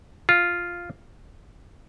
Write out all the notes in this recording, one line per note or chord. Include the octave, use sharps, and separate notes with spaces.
F4